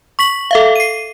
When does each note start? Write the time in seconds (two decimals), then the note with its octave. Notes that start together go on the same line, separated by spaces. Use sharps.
0.19 C#6 B6 F#7
0.51 A4 E5 F5
0.76 C7 D#7